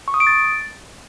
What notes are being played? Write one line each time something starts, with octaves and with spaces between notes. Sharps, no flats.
C#6
D#6
D7
A6